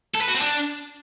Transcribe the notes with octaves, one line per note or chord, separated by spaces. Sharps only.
A4
B4
F#4
C4
D4